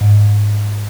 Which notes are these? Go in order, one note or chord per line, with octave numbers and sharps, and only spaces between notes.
G#2